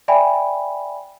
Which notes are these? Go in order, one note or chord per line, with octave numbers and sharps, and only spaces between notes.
D5 E5 G5 G#5 B5